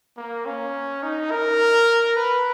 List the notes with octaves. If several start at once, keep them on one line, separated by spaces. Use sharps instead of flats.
A#3
C#4
D#4
A#4
B4